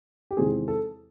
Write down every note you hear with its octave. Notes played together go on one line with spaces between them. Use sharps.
G4
E2 C3 D#3 G#3 C4 G#4
A4